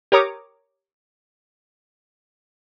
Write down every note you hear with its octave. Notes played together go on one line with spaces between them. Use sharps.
G4 A#4 C#5 A#5 D6 D#6